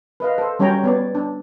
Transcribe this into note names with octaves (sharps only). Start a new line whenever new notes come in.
B4 D#5 F5
A4 C5
G3 C#4 F#4 C#5 G5 A#5
B3 C#5 D5
D4